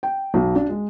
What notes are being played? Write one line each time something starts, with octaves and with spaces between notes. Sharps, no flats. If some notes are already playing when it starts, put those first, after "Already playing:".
G5
B1
D4
G#3